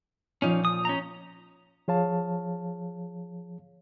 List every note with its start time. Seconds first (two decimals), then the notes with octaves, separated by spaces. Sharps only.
0.42 A#2 F3 C#4 D#4
0.65 D#6
0.85 C#4 D#4 A#5
1.88 F3 G#4 C#5 F5 A5